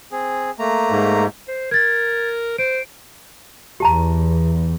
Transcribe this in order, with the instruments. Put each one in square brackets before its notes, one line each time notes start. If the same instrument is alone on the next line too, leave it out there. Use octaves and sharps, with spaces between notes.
[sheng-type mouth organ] C4 G#4
A3 A#3 A#5
[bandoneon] G#2
[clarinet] C5
[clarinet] A#4 [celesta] G#6 A6
[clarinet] C5 [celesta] D7
[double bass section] E2 [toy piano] G4 A5 A#5